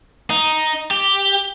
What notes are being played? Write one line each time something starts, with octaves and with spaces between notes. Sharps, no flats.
D#4
G4